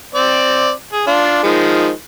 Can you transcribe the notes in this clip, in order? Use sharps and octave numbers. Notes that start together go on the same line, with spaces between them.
C4 D5
G#4
D4 F4
D#3 F3 G#3